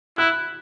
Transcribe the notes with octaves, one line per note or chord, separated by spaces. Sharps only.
E4 F#6